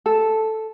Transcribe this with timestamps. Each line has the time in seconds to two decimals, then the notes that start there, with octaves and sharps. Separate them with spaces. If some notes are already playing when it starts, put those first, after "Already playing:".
0.06 A4